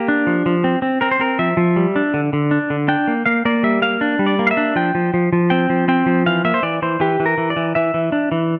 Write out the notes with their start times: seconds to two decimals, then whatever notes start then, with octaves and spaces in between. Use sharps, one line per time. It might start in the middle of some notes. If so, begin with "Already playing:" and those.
Already playing: A#3 G4
0.08 D4
0.27 F3
0.46 F3
0.64 C4
0.82 C4
1.01 C4 A#4
1.11 C5
1.20 C4 A#4
1.39 F3 E5
1.57 F3
1.76 G3
1.96 D4
2.14 D3
2.33 D3
2.51 D4
2.70 D3
2.88 D4 G5
3.08 A#3
3.26 A#3 F5
3.45 A#3 D5
3.63 G3 E5
3.82 A#3 F5
4.01 D4
4.19 G3
4.26 D5
4.39 A#3
4.47 F5
4.51 E5
4.57 D4
4.76 F3 G5
4.95 F3
5.14 F3
5.33 F3
5.50 C4 G5
5.70 F3
5.88 C4 G5
6.06 F3
6.26 E3 F5
6.45 A#3 E5
6.54 C5
6.63 E3 D5
6.82 E3 C5
7.00 E3 G4
7.20 E3
7.26 A#4
7.38 E3
7.50 D5
7.56 E3
7.75 E3 E5
7.94 E3
8.12 D4
8.32 E3